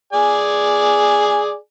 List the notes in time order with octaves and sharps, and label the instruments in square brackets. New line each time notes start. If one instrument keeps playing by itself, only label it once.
[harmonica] G#4 D5 G#5